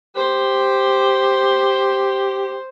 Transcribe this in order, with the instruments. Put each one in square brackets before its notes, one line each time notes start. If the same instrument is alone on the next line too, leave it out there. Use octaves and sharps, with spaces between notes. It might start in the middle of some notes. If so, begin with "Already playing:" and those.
[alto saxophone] G4 [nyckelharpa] C5